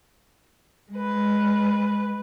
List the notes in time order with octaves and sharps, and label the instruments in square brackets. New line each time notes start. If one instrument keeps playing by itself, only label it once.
[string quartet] G#3 B4